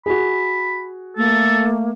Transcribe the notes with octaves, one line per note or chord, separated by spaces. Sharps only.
F#4 G#4 B5
A3 A#3 A4